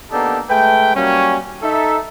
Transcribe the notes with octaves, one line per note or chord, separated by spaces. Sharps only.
A#3 B3 D4 D#4 G4 A4
G#3 A3 B4 G5
F#3 G3 A#3 C#4
D#4 A4 E5